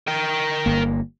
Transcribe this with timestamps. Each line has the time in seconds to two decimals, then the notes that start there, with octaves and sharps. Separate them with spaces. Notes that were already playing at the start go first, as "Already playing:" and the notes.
0.07 A#4 G5
0.66 G1 A#3